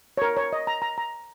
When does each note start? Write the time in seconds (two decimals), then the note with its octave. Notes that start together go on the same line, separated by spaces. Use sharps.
0.18 C#5
0.22 A#4
0.37 C#5
0.53 D#5
0.67 A#5
0.82 A#5
0.98 A#5